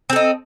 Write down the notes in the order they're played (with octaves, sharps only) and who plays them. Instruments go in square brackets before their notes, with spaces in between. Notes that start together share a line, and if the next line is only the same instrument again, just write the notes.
[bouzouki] C4
A4
D#4